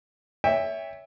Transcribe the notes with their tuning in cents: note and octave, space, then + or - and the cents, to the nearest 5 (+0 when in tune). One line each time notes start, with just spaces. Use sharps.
C#5 +20 E5 -5 G5 +35